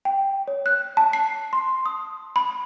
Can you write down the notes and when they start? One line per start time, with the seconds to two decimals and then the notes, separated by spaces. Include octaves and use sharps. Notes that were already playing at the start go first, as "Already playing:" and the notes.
0.05 G5
0.48 C#5
0.66 F#6
0.97 A5
1.13 C7
1.53 C6
1.86 D#6
2.36 B5